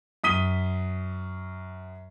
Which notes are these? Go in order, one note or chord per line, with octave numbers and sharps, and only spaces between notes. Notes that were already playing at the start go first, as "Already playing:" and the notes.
F#2 D#6 B6 D#7 G7